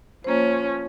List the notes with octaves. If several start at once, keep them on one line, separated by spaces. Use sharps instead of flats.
F3 A#3 C#4 C5